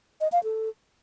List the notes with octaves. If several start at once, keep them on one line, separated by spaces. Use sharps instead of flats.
D#5
F5
A4